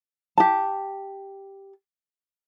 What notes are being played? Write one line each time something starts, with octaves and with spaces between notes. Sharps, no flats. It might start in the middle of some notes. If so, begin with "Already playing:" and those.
G4 A5